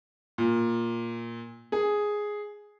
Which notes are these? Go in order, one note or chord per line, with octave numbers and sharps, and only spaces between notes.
A#2
G#4